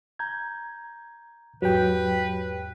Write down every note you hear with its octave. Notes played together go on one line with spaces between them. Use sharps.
A#5 G6 G#6
E2 G#2 F#3 G4 B4 G5